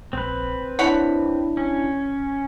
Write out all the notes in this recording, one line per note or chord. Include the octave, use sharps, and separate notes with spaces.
A#1 C4 B4
D4 E4 C#5 F#5 B5
C#4